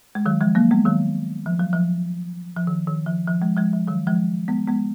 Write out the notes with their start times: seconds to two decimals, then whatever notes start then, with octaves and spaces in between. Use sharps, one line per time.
0.15 G#3
0.26 D#3 F#3
0.41 F3 G#3
0.55 F#3 A#3
0.71 G#3 B3
0.85 D#3 F#3
1.46 F3
1.59 F#3
1.73 F3
2.56 F3
2.67 D#3
2.87 D#3
3.06 F3
3.28 F3
3.42 F3 G#3
3.57 F3 G#3
3.73 F3
3.87 D#3 F#3
4.07 F3 G#3
4.48 G#3 B3
4.67 G#3 B3